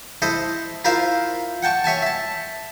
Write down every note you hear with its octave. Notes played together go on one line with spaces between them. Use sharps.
E4 A4 C5 D#5
E4 F4 A#4 C5 E5 F5
F#5 G5 A5 C#6
C#5 E5 G#5 A5
E5 A5